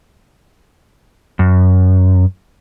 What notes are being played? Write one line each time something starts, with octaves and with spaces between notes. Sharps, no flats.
F#2